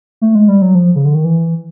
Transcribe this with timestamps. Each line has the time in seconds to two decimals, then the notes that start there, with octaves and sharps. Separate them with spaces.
0.21 A3
0.35 G#3
0.48 G3
0.62 F#3
0.75 F3
0.96 C#3
1.05 D3
1.14 D#3
1.24 E3